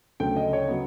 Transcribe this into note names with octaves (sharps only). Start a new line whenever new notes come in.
D2 C#3 F#3 A3 G5
D#5
C#5
C#3 F#3 B3